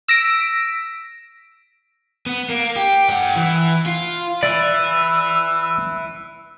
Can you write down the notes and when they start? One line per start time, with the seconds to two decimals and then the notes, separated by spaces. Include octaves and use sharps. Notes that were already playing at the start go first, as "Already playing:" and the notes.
0.08 E6 A#6 B6 D7
2.26 B3
2.50 A#3
2.76 G4
3.09 G2 F#5
3.36 E3
3.86 F4
4.43 E4 B4 D5 E6